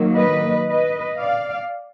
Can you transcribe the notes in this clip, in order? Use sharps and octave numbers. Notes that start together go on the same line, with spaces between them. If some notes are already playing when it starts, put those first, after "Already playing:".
Already playing: D#3 F#3 A#3
B4 D#5
B4 D#5
D5 F5